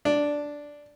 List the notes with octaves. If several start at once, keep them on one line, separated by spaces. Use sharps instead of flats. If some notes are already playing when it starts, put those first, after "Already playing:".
D4